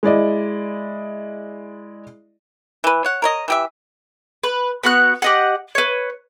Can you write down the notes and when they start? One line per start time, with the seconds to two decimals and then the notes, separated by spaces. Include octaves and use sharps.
0.03 G#3 E4 D5 D#5
2.84 E3 B4
3.05 C#5 F#5
3.22 A#4 C#5 D#5
3.48 E3 G4 E5
4.44 B4
4.83 B3 F#4 F#5 F#6
5.22 G4 D#5 F#5
5.75 B4 C#5